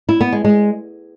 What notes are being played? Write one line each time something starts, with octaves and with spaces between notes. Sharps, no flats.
E4
B3
G#3
G#3